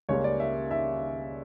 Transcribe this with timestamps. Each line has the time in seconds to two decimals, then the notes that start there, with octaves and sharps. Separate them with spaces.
0.09 C#2 C#3 G3 A#3 C#5
0.24 D5
0.40 E5
0.71 E5